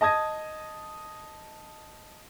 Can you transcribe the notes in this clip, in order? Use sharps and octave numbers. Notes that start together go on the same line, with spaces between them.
D#5 A5 D#6 G#6 A#6